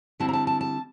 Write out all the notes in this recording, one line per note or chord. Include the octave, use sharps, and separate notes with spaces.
D3 G3 C4 E4 A5
A#5
A5
A5
A5